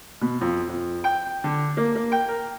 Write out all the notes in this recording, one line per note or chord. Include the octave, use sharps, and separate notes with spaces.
B2
F2
F2
G5
D3
A#3
A#3
G5
A#4